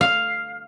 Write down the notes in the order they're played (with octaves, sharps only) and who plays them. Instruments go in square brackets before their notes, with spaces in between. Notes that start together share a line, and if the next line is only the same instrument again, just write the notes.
[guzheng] F5